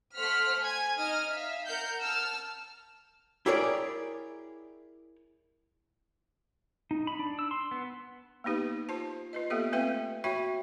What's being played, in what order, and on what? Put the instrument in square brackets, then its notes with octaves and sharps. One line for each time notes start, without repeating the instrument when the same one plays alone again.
[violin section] A3 C5 F#5 F6 B6
G#5 G#6
D#4 D#6 F6
E5 F5
A#4 F#5 F6 G6
A5 E6 F6
[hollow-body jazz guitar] E4 G4 G#4 A#4 C#5 D5
[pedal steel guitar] D#4
B5
D4
E6
C6
B3
[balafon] A#3 B3 D#4 G4 B4
F4 C5 A5
F4 B4 D#5
A#3 B3 G4 A4 E5
A3 C4 B4 E5 F5 G5
F#4 C#5 E5 G5 B5